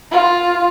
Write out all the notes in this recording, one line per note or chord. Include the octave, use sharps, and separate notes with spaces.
F4